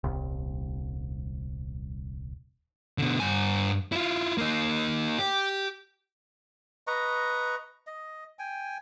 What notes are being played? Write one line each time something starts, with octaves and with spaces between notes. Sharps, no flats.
D#1 C2
B2 D3
G2 G#5
E4 F4
A#3 D#4
G4
B4 D#5 A#5 C#6
D#5
G5 G#5